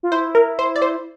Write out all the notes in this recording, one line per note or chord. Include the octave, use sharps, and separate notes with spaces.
F4
E4 C5
A#4
C5
D5
C5